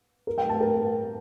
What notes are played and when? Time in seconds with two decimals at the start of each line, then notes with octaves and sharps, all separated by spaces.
0.27 A#4
0.38 G5
0.49 A5
0.61 A#4